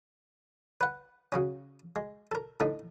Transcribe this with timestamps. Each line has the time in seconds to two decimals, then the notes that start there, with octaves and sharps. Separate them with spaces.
0.81 B4 F#5
1.32 C#3 F#3 C#4
1.96 G#3
2.32 A4 A#4
2.60 A2 D3 A3 D#4